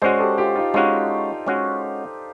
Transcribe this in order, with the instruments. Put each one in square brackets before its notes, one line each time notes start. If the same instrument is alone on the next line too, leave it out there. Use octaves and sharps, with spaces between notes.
[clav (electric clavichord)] G#3 C#4 F#4 [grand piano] C5 D5
[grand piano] G4 A4
F4 G4
D#4 F4
[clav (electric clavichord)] G#3 C#4 F#4 [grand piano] D#4 F4
[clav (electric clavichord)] G#3 C#4 F#4